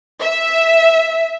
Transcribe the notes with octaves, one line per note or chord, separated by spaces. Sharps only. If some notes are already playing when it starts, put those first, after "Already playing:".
E5